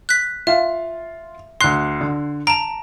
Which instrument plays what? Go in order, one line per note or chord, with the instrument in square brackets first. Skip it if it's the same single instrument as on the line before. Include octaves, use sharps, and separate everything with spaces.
[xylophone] F#6 B6
[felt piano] F4 F5 [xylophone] E5
[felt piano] D2 C7 [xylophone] C6 F#6
[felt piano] D3
[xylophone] A5 A#5 [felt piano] D7